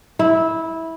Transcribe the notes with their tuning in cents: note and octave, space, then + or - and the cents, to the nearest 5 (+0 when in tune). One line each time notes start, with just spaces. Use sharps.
E4 -15